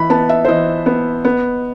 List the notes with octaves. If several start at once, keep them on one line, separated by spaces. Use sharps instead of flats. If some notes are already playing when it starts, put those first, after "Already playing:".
Already playing: E3 B5
B3 A5
E5
C5
E3 D#5
B3
B3